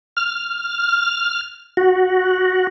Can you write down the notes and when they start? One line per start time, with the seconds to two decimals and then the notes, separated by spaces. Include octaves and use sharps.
0.17 F6
1.77 F#4